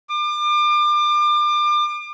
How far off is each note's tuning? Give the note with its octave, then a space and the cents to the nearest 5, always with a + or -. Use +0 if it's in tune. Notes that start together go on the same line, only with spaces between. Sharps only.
D6 +35